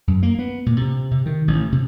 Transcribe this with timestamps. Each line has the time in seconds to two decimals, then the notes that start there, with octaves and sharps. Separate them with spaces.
0.07 F#2
0.23 A#3
0.39 B3
0.66 A#2
0.81 C3
1.11 C3
1.26 D#3
1.48 A1
1.72 C3